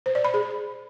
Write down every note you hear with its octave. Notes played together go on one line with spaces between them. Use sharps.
C5
D5
B5
G#4